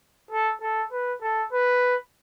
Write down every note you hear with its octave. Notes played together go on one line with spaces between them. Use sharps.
A4
A4
B4
A4
B4